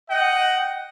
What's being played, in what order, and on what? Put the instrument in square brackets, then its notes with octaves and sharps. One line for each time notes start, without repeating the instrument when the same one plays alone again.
[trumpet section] D#5 F#5 G5